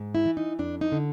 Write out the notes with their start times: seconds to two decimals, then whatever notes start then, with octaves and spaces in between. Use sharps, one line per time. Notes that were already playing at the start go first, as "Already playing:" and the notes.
Already playing: G#2
0.15 E4
0.26 E3
0.37 D#4
0.59 F2 D4
0.81 D#4
0.92 D3